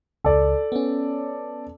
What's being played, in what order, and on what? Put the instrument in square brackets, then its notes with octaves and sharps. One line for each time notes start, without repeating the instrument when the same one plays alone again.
[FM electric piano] C#2 [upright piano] A4 D5
[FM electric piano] B3 C#4